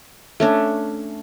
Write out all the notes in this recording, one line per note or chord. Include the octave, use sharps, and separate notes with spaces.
A3 C#4 D4